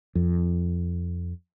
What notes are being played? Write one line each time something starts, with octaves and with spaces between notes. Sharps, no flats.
F2